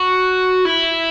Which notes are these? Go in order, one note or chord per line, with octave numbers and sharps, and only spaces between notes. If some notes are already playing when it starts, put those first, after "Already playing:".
Already playing: F#4
E4